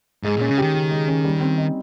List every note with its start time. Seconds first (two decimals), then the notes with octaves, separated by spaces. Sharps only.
0.23 G#2 G#3
0.37 A#2 C#4
0.49 C#3
0.58 D#3 G4
0.74 C#3
0.91 G#3
1.08 C#4
1.25 G3
1.41 C4
1.58 D#4